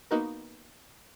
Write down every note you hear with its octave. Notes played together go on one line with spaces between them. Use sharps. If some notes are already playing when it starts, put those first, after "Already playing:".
A#3 B3 D#4 F#4 A#4